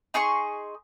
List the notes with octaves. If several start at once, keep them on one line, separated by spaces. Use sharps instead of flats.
D#4 G#4 C6 C#6